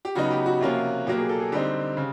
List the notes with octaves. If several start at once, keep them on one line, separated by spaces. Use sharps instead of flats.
G4
C#3 F#3 B3 D#4 F#4
G4
F#4
C3 F3 A#3 C#4 F4
B2 F#3 A#3 G4
G#4
A4
G#4
D3 G3 C4 D#4 G4
C#3